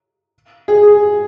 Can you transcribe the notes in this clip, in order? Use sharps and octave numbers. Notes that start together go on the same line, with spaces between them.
G#4